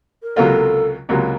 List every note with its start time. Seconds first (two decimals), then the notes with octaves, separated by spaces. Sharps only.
0.22 A#4
0.36 C#2 C3 F#3 A#3 F4 A4
1.09 C#2 C3 F#3 A#3 F4